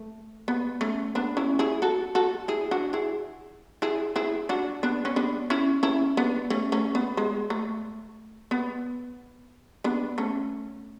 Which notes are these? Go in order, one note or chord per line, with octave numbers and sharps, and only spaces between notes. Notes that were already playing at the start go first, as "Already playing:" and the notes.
Already playing: A3
B3
A3 C#4
B3 D4
C#4 E4
E4 G#4
F#4 A4
F#4 A4
E4 G#4
D4 F#4
E4 G#4
E4 G#4
E4 G#4
D4 F#4
B3 D4
C#4
B3 D4
C#4 E4
C#4 E4
B3 D4
A3 C#4
A3 C#4
B3
G#3
A3
B3
B3 D4
A3 C#4